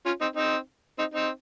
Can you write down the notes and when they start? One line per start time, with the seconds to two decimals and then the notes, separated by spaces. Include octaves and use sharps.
0.06 C#4 F4
0.21 C4 D#4
0.36 C4 D#4
0.98 C4 D#4
1.14 C4 D#4